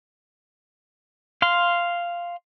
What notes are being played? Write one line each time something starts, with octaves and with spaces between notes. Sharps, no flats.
F5 C6